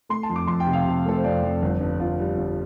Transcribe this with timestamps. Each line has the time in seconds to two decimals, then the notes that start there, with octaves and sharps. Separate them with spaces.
0.09 A3 C6
0.23 A5
0.30 F2
0.36 D6
0.47 F2 C6
0.60 G5
0.66 C3
0.73 F5
0.86 C3
1.05 A3 A4
1.17 C5
1.24 F2 D5
1.43 F2
1.62 G1
1.80 G2
2.00 G1 F4
2.19 G3
2.37 G1